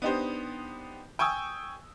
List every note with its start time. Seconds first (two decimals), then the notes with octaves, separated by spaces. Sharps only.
0.02 B3 D4 D#4 G4 C5
1.19 G5 G#5 C#6 D#6 E6